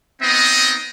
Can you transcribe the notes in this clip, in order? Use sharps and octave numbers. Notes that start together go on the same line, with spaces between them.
B3 C4 D#4 D#5